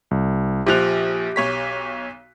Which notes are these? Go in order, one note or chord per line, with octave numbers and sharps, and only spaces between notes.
C2
A#1 F3 G4 F#6 F7
B1 C#5 B6